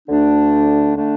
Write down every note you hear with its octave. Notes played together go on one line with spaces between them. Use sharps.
D2 D3 A3 D4
D3 A3 D4